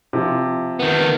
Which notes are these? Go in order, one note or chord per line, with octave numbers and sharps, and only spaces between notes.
C3 F3
D#3 B3